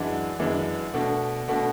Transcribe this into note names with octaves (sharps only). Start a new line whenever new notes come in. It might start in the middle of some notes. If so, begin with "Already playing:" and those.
Already playing: F#2 E3 G#3 D4 F#4
F#2 E3 G#3 D4
B2 A3 D4 F#4
B2 A3 D4 F#4